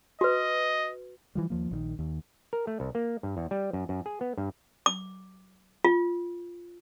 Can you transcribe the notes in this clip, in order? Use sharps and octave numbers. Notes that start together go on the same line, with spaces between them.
F#4 B4 D#5
E3 F3 G3
D#2 F3 A#3
A#1 D3 D#3
D#2
A#4
A3
C2
A#3
G2
E2
G3
F#2
F#2
G#4
B3
G2
D6
F4